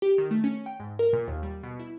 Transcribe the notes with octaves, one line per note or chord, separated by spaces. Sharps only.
G4
D#3
A3
C#4
G5
G#2
A#4
A#2
D#2
G3
B2
E4